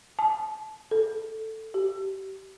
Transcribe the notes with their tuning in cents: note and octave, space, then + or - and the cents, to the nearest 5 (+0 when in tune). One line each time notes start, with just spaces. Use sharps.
A5 -30
A4 +5
G4 -35